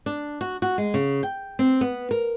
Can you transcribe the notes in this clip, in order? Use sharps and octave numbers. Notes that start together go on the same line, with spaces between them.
D4
F#4
F#4
G#3
C#3
G5
C4
B3
A#4